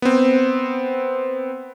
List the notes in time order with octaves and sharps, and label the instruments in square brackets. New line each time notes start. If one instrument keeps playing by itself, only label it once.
[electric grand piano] B3 C4